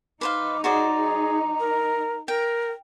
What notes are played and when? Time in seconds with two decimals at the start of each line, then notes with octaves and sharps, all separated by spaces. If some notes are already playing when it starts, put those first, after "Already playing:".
0.21 D#4 B4 C5 F5 D6
0.64 F#4 G#4 C5 D5 A#5
0.97 G#4
1.60 A#4
2.28 A#4 G5